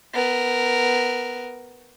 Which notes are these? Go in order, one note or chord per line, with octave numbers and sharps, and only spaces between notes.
B3 A#4